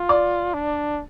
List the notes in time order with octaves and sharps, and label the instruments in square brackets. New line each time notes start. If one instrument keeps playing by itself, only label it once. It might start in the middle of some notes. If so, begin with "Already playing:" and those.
Already playing: [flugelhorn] F4
[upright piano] D5
[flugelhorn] D4